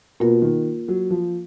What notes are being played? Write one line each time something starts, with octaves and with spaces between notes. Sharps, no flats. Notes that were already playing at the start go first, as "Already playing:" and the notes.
B2 A#3 F4 A#4
D#3
F#3
F3